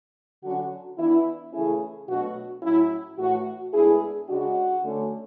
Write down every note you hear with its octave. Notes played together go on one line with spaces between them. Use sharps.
D3 F#3 C#4 F#4
E3 B3 D4 E4
C#3 E3 A3 C#4 E4 G#4
B2 F#3 A3 D4 F#4
A2 F#3 C#4 E4
A2 E3 A3 F#4
A2 G#3 B3 D4 E4 G#4
C#3 G#3 D4 F#4
D3 A3 C#4